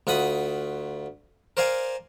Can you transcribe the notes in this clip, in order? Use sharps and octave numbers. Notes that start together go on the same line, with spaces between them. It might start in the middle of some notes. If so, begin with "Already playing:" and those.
D2 F4 F#5 B5 D#6
A#4 C5 D5 F5 G#5